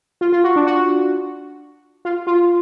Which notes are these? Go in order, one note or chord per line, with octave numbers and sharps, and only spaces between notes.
F4
F4
F#4
D4
F#4
F4
F4